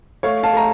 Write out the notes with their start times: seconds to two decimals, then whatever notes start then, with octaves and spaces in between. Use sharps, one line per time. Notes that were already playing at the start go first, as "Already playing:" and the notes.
0.23 A3 C#5 F5
0.43 F5 A5
0.53 A3 A#5